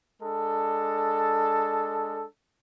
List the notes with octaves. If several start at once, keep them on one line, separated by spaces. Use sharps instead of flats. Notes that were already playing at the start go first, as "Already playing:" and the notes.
G#3 D4 A4